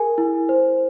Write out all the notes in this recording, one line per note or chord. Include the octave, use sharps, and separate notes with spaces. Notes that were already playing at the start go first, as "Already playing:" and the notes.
Already playing: G#4 A#4 G#5
E4
C5